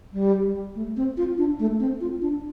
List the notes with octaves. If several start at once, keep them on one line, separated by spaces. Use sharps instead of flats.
G3
A3
C4
F4
D4
A3
C4
F4
D4